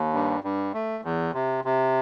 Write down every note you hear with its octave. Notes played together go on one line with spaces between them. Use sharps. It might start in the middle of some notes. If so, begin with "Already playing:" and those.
Already playing: D#2
G2
G2
A3
E2
C3
C3